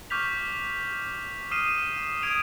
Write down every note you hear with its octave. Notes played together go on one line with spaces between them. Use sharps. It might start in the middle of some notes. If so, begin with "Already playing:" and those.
C#6 D6 F6 G6 B6 F7
D#6 F6 C7 D#7 E7
D#6 G#6 D7 F7